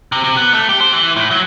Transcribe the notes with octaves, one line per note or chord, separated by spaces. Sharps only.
C3
C3
B3
A3
G4
C5
E3
A2
F#3